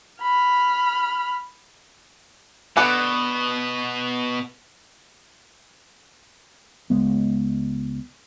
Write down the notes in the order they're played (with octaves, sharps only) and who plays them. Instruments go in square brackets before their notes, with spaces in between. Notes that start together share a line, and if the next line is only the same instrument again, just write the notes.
[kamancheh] B5 F6
[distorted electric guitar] B2 [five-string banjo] B3 D4 A4
[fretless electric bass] C#2 G#3 B3